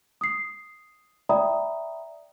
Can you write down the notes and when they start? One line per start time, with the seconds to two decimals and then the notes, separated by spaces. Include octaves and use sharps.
0.21 D#6 C7
1.29 D5 E5 G5 A#5 B5 D#6